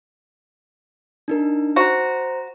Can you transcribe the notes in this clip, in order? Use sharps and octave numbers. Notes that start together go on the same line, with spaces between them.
D4 D#4 A#4
F#4 C5 A#5